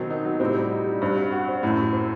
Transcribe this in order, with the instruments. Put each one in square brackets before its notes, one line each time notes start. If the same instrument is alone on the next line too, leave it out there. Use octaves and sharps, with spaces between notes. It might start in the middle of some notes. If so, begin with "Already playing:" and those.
Already playing: [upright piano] B2 D#3 [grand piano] F#3 C4
[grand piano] D#4
F#3
[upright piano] A2 C3 [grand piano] C4
[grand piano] G3
D#4
G3
[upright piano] G2 [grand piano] C4
[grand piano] F#3
F#4
C5
[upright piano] F#2 A2 [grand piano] A3
[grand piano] F#3
C4